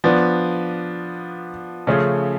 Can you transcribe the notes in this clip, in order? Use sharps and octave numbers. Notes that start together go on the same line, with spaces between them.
F3 B3 D4
C#3 F3 A3 C#4 G#4